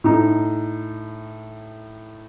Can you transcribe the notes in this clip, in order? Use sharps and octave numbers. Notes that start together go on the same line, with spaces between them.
A2 D#4